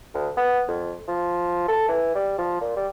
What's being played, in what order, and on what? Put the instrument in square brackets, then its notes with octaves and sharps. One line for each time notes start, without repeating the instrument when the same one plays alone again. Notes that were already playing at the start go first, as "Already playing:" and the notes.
[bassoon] D2
B3
F2
F3
A4
E3
G3
F3
A#2
G3